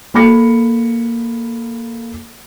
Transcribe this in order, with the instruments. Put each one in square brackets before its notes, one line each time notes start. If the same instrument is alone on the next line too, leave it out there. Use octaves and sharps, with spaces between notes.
[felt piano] A#3 A4 B5 A#6 C#7